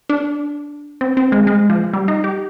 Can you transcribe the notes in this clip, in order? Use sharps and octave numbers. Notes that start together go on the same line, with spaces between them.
D4
C4
C4
G#3
G#3
F3
G3
D#4
G4